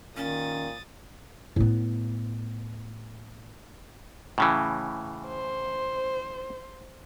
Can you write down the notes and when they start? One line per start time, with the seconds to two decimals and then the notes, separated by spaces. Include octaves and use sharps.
0.17 A#2 D#3 C#4 D#6 A6
1.56 A2 B3
4.38 A2 C#3 E3
5.27 C5